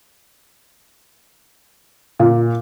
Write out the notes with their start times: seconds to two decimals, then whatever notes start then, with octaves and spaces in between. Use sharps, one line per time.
2.19 A#2